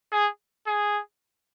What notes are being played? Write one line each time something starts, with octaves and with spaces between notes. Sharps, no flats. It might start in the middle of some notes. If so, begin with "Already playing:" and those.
G#4
G#4